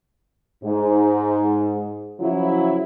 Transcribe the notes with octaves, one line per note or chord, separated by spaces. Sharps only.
G#2
C#3 F3 F#3 E4